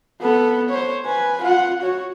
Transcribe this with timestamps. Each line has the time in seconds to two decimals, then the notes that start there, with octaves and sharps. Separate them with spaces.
0.21 B3 A4
0.69 C5 C#5
1.06 B4 G#5
1.42 F4 F#5
1.81 F#4 C#5